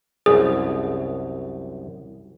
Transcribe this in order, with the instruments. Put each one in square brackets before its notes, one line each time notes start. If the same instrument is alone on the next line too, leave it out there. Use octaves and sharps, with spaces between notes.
[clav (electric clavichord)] C2 F#2 [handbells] G#4